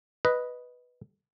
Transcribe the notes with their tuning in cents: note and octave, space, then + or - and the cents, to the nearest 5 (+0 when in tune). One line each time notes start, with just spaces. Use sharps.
B4 +0 D#5 +0